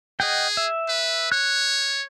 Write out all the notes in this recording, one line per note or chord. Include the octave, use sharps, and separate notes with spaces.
G#4 D#5 F#5 G5
E5
B4
C#5 F#6